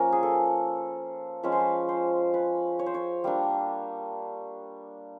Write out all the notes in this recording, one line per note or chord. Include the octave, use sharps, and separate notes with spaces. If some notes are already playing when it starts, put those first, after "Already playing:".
Already playing: F3 A#3 C#4 A#4
G#4
A4
F3 G#3 C#4 B4
C5
B4
C5
B4
C#5
C5
C#5
G3 A#3 D4